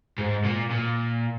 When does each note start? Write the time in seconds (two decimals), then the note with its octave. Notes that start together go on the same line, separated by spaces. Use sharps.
0.18 G#2
0.44 A#2
0.70 A#2